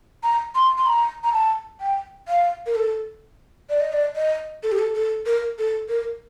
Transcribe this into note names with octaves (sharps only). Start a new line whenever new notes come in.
A#5
C6
C6
A#5
A#5
A5
G5
F5
A#4
A4
D5
D#5
D5
D#5
A4
G4
A4
A4
A#4
A4
A#4